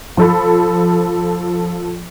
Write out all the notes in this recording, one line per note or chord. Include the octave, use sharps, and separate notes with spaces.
F3 A4 B5